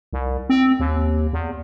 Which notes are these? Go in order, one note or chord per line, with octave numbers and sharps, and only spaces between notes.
C2
C4
D#2
E2